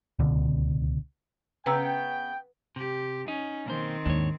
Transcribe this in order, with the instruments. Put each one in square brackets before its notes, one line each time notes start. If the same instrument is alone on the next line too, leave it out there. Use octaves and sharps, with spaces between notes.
[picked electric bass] D1 C#2 B2 D3
[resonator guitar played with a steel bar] C#3 B3 C#4 [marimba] B4 A#5 E6 [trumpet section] G5
[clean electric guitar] C3 [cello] G4
[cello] C#4 [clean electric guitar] D#4
[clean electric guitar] B1 A#3 C5 [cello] D#3 C4
[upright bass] D#2 G#2 [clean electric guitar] D4 C#5